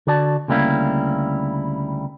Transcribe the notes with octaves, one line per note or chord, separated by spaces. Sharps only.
D3 F#4 D5 A5
D2 C#3 G3 A#3 E4 F5